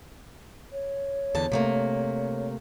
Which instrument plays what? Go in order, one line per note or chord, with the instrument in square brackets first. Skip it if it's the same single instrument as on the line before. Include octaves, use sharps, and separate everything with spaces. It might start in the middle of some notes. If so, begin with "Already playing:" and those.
[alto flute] C#5
[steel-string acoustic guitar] E2 D3 A5
C3 A3 A#3